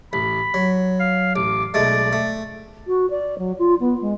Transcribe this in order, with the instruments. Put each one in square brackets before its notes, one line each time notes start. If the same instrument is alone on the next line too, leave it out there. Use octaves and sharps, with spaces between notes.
[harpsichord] A1 [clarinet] B5
[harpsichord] F#3
[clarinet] F5
[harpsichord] A1 [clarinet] D6
[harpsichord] B1 G#3 A3 [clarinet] D5
[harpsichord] A3
[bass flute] F#4
D5
F#3
F4
B3
G#3